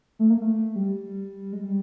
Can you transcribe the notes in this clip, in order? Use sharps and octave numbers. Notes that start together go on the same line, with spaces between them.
A3
A#3
A3
G3
G#3
G3